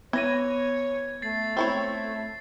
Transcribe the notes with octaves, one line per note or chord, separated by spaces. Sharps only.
E3 B3 C#5 G#6 A#6 D#7
A3 A6 C7
C4 E4 C#5